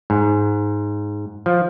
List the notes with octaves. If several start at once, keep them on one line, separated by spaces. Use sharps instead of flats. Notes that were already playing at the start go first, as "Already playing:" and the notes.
G#2
F3